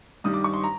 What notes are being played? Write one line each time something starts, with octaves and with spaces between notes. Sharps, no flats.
G2 D#3 G3 D#6
D6
C#6
C6
A#5